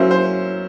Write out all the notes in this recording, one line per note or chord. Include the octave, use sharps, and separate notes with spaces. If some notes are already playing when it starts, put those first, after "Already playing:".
Already playing: F#3 A#3 C#4 E4 C5
C5